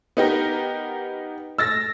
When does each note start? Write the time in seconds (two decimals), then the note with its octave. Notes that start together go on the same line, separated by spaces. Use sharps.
0.17 B3 D#4 G4 A#4
1.58 E6 A6 A#6